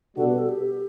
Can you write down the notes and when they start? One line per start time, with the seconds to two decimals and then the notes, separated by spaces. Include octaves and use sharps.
0.17 B2 G3 D4 F#4 A4
0.28 B4
0.38 A4
0.49 G4